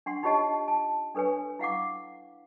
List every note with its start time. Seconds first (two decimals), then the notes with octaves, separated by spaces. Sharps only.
0.06 D4 F#5 C6
0.23 D#4 F4 G4 C#5 D#5 A5
0.68 A5
1.15 D4 A4 B4 C#5 G#5
1.59 E4 F5 F#5 D6